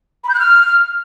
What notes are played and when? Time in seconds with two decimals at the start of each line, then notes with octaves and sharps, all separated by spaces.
0.24 B5
0.29 G6
0.34 F#6
0.39 F6